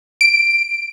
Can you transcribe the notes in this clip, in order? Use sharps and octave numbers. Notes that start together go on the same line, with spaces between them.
D7